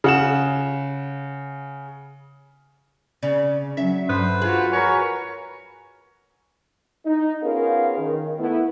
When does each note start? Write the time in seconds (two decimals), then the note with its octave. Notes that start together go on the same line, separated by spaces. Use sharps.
0.04 C#3 F#5 E7
3.23 C#3 D5
3.77 F#3 C#4 E5
4.09 G2 D3 B4 C5
4.42 F4 F#4 G#4
4.72 F#4 A#4 B4 C#5 G#5
7.05 D#4
7.42 B3 C#4 F4 G#4 A#4 F5
7.98 D#3
8.39 A3 B3 E4